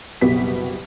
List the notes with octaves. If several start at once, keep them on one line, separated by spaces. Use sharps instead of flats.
F#1 C2 B2 B3 G4 B6